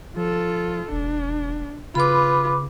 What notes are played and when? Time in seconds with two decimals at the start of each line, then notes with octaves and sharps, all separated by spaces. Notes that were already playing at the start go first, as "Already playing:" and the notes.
0.16 F3 F4 A4
0.91 E1 D4
1.95 C#3 F4 B4 B5 D6